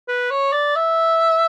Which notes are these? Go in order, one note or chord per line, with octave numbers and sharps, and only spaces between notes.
B4
C#5
D5
E5